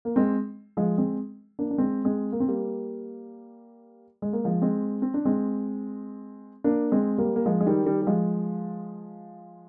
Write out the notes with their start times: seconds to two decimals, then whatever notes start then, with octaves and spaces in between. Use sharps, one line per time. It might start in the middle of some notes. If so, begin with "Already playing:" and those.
0.05 A#3
0.16 G#3 C4
0.77 F3 G#3
0.98 G#3 C4
1.59 A#3 D4
1.71 D4
1.78 G#3 C4
2.05 G#3 C4
2.32 A#3
2.40 C4
2.48 G3 A#3
4.22 G#3
4.33 A#3
4.44 F3 G#3
4.62 G#3 C4
5.02 C4
5.14 D4
5.25 G#3 C4
6.64 A#3 D4
6.92 G#3 C4
7.18 G3 A#3
7.36 A#3
7.46 F3 G#3
7.61 G#3
7.66 D#3 G3
7.86 D#3 G3
8.02 G3
8.07 F3 G#3